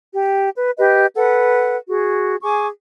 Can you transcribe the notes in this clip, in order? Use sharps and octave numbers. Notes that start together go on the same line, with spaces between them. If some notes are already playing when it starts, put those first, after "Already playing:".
G4
B4
G4 B4 D#5
A4 B4 F#5
F#4 G#4
G#4 G#5 C#6 D6